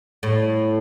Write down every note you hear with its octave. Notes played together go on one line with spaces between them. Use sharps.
A2